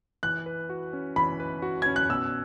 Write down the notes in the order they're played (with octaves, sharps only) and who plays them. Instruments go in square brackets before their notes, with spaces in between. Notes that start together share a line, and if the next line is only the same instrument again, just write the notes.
[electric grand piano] E3 [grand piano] F#6
[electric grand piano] B4
F#4
C#4
[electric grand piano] E3 [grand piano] B5
[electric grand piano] B4
F#4
[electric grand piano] C#4 [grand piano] G#6
[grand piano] F#6
[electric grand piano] B2 [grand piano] E6